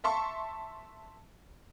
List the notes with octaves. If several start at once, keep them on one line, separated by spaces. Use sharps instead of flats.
E5 A5 C6 C#6